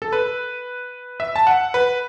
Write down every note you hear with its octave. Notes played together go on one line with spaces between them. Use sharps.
A4
B4
E5
A5
F#5
B4